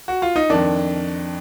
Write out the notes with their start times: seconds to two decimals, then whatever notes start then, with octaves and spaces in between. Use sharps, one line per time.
0.08 F#4
0.22 F4
0.36 D#4
0.50 F2 D#3 D4